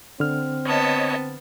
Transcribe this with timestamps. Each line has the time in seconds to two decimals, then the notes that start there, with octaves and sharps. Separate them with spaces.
0.20 D3 C4 F6
0.65 B3 C#5 D#5 A5